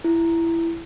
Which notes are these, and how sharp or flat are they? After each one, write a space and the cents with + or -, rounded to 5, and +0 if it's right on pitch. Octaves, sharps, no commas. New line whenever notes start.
E4 +15